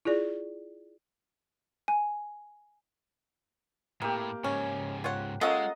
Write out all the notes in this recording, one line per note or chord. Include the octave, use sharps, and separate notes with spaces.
E4 F4 G#4 D5
G#5
A2 C3 A#3 G4
G#2 C#3 C#4
F4 C#5 F#5
G#3 A#3 C#4 F4 A4 D#5 F#5 A#5